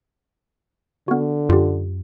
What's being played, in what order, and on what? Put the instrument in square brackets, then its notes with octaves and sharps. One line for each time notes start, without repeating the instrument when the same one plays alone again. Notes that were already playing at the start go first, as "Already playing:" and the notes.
[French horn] D3 [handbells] B3 F#4
[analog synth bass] F#2 [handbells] F4 G4